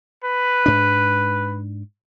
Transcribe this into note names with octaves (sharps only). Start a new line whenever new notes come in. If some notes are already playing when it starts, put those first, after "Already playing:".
B4
G#2 D4